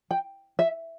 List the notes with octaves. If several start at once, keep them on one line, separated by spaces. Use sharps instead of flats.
G5
E5